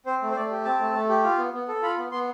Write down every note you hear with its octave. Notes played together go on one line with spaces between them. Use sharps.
C4 C5
A3
C5
A3 D5
G4
C4 A5
A3
A3
G4
F4
B3
B3
A4
F4 B5
B3
B3 C6